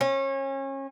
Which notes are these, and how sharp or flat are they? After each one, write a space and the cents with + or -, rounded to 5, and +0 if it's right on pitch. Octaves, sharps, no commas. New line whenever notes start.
C#4 -30